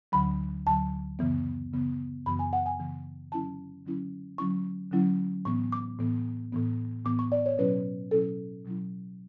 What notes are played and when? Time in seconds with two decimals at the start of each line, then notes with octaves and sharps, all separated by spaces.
0.12 D2 D3 F#3 B5
0.66 D2 D3 F#3 A5
1.19 F#2 C#3 E3 B3
1.73 F#2 C#3 E3 B3
2.26 F#2 C#3 E3 B3 B5
2.39 G#5
2.53 F#5
2.66 G#5
2.79 F#2 C#3 E3 B3
3.32 D3 F#3 C#4 E4 A5
3.86 D3 F#3 C#4 E4
4.38 D3 F#3 C#4 E4 C#6
4.92 D3 F#3 C#4 E4
5.45 A2 E3 B3 C#6
5.72 D6
5.99 A2 E3 B3
6.52 A2 E3 B3
7.05 A2 E3 B3 D6
7.19 C#6
7.32 D5
7.46 C#5
7.58 B2 F#3 C#4 E4 B4
8.11 B2 F#3 C#4 E4 A4
8.65 B2 F#3 C#4 E4